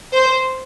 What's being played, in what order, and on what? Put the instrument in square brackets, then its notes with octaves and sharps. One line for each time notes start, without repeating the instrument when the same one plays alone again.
[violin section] C5